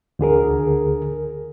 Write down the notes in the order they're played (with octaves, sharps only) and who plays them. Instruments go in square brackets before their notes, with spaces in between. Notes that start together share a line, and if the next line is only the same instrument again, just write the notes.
[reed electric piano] D2 D3 G#4 A#4